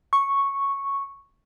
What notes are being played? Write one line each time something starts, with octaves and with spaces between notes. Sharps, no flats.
C#6